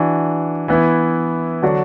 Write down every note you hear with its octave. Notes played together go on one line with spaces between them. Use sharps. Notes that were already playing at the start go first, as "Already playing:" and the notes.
Already playing: E3 D4 F#4
E3 B3 E4
D3 F#3 D4 F#4